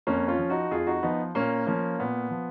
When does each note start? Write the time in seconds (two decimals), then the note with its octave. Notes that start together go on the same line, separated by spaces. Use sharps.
0.07 F2 A#3 C#4
0.28 C#4 F4
0.39 F3
0.50 D#4 F#4
0.71 F2 F4 G#4
0.87 D#4 F#4
1.03 F3 B3 D#4
1.35 A#2 A#3 C#4
1.67 F3 A#3 C#4
1.99 A#2 B3
2.31 F3